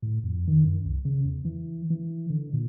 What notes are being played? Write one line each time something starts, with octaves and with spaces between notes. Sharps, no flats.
A2
F2
D#3
F#2
C2
C#3
E2
E3
E3
D3
A#2